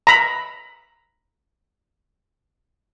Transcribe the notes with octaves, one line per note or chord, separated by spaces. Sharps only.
A#5 B5